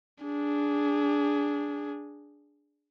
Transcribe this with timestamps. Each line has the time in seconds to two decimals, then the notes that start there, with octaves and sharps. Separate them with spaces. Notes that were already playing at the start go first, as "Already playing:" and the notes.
0.24 D4 G#4